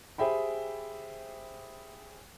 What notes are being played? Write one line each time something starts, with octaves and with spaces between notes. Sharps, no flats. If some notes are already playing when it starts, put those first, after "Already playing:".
G4 G#4 C5 E5 G5 B5